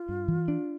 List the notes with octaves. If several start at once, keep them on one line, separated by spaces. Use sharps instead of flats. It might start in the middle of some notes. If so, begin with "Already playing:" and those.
Already playing: F4
G2
E3
D4